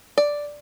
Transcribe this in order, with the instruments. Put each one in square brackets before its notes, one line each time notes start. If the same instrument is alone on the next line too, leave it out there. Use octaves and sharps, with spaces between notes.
[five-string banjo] D5